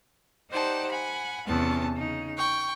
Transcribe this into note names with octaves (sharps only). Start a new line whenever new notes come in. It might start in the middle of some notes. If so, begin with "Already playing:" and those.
D#4 G4 C5 D5 F#5 A5
F#5 G#5 B5
E2 C3 B3 C#4 A5
C#3 D#4
G5 C#6